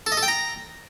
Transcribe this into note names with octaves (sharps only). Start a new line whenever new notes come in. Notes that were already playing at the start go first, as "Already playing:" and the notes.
A4
D#5
A4
G5
A#5